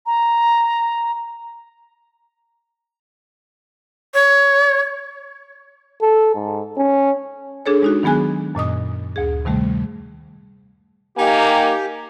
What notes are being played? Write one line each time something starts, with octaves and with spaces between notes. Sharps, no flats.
A#5
C#5
A4
G#2
C#4
D4 G#4 A4 C#5
G#3 D#4 F#4
D#3 F#3 B3 G#4 G#5 F#6
F#2 A#2 D#5 D#6
D2 G#4
C3 D#3 G3 A3
A#3 D#4 G4 G#5